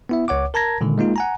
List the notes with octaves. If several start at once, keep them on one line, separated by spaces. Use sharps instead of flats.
B3 E4 E5
C#2 C#5 F#5 D6
A#4 A5 A#5 G#6 A#6
A#2 D3 D#3 G#3
G#3 A#3 D#4 F4
F#5 G#5 A#5